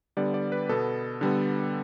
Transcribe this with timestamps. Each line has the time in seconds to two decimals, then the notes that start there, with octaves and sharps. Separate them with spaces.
0.17 D3 G3 B3 D5
0.34 D5
0.52 B4
0.69 B2 B3 A4
1.21 D3 G3 B3